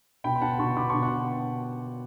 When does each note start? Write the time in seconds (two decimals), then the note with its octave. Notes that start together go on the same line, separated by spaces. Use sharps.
0.24 B2 G5 B5
0.35 B5
0.41 B2 F#5 A5
0.59 B2 A5 C#6
0.76 B2 B5 D6
0.90 A5 C#6
0.94 B2
1.03 F#5 A5